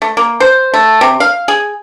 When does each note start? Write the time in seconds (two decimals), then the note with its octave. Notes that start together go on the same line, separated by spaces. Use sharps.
0.02 A3
0.17 A#3
0.40 C5
0.74 A3
1.01 C3
1.20 F5
1.48 G#4